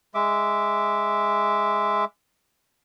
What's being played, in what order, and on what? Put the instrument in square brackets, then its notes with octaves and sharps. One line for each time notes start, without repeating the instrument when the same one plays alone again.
[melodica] G#3 E5 D6